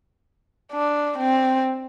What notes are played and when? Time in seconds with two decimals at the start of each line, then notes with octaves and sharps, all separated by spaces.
0.72 D4
1.18 C4